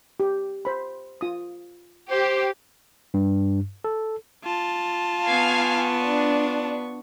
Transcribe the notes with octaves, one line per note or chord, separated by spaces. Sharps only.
G4
C5 B5
F4 D#6
G4 C5
G2
A4
F4 A5
B3 F5 G#5 C#6
D4